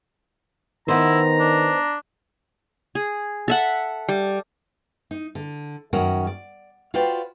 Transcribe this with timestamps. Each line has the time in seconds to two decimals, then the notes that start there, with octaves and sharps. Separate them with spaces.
0.88 D#3 B3 D#4 E4 C5 A#5
1.40 D4
2.95 G#4
3.48 A4 E5 F#5
4.09 G3
5.11 D#4
5.35 D3
5.93 F#2 D#3 C#4 F#4 A#4
6.27 D5
6.94 F4 F#4 B4 C5 D5 G5